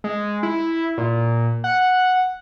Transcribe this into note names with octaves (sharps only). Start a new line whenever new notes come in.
G#3
E4
A#2
F#5